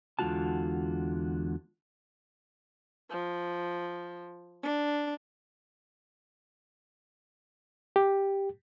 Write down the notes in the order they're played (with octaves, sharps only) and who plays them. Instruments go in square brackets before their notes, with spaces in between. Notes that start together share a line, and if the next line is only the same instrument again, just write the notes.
[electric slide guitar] E2 D3 G#3 F4 F#4 A5
[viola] F3
D4
[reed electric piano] G4